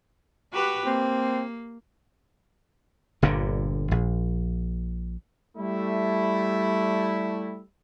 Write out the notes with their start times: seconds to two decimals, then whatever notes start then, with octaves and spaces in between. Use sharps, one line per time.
0.53 F#4 G4 B4
0.86 A#3 C4
3.22 G1 G2 A#2 D3
3.91 A#1
5.57 G3 A3 E4